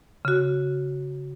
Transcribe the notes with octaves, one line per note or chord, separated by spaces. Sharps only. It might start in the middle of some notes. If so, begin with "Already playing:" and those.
C#3 F#4